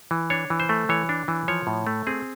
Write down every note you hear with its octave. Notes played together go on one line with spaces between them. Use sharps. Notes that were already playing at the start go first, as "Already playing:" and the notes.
E3
D4 C#5
E3
C5
A3
E3 C#5
D4
E3
F3 C#5
A2
A3
C4 G#4